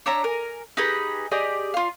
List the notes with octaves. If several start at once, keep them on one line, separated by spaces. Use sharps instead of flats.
D4 C#5 E5 A#5
A#4 G#5
D#4 G4 G#4 B4
G4 G#4 D5 D#5
F4 F5